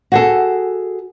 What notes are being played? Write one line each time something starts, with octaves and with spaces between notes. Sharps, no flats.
F#4 G#4 A4